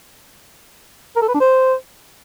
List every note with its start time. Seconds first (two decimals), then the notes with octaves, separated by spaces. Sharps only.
1.16 A#4
1.22 A4
1.28 B4
1.34 D4
1.40 C5